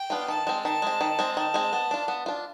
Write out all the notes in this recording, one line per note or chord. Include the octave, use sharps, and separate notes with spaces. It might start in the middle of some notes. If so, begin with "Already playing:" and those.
Already playing: G5
B3 D4 F4
D#3 A5
G#3 C4
D#3 A5
G#3 C4
D#3
G#3 C4
D#3 A5
G#3 C4
B3
D4 F4
B3
D4 F4